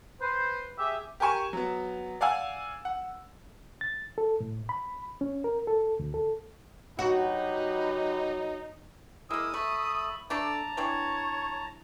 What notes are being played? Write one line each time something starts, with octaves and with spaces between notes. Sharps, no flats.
B4 C5
G4 G#4 E5
G4 A#4 G#5 C#6 E7
F#3 B3
D5 F5 F#5 G#5 E6
F#5
A6
A4
A2
B5
C#4
A#4
A4
D2
A4
F#3 D#4 F#4 G4 B4
G#3 A#3 E4 A#4 D#6 E6
A3 E5 B5
A3 D4 A4 D5 A5 A#5
E3 C4 D4 C#5